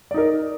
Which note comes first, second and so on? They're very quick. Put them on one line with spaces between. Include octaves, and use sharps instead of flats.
D5 D#4 A#4